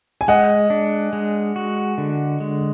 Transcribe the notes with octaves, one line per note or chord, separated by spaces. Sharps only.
G#5
G#3 D#5 F#5
D4
G#3
F#4
D3
G#3